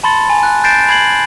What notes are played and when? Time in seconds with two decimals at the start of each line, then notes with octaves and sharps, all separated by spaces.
0.03 A5 B5 C6 A6 C#7
0.29 G#5
0.43 F#6
0.64 G6 A6 A#6 C7 D7 E7
0.89 B5 G#6 C7 F#7